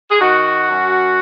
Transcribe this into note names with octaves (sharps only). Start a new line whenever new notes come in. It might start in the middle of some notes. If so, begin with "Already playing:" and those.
G#4
D#3 F#4
F#2